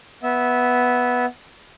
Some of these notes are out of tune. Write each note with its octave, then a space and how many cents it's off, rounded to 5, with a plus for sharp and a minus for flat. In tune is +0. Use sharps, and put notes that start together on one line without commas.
B3 +0 E5 -10